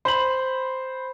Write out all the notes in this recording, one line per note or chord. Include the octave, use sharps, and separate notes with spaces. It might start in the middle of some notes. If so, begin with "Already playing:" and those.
C5 B5 F#7